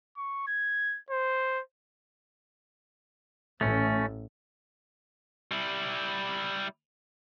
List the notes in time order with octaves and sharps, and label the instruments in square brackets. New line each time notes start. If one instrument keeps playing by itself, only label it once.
[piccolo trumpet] C#6
G#6
C5
[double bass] A1 [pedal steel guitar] A3 C#4
[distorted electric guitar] G3 E4